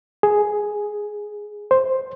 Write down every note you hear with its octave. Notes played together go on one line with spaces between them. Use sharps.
G#4
C5